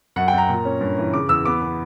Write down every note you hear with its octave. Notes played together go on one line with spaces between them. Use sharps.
F#2 F#5
G5
F#2 A#5
A#2
C#4
G2
E3
C#3 D6
E2 E6
B3 D6
B3